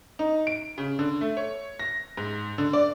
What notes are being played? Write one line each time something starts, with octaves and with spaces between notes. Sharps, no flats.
D#4
D7
C#3
D3
A3
C#5
A#6
G#2
D3
D5